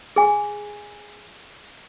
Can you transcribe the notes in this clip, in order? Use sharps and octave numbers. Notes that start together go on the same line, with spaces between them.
G#4 G#5